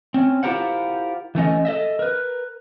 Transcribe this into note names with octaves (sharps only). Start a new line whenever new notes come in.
C4 C#4
E4 F4 G4 A#4 C5 F#5
E3 A3 C#4 D#5
A4 D#5 E5
A#4 B4